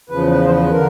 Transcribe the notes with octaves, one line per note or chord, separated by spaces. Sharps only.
E2 C#3 F3 B4
B4
C5
B4
D3 A#4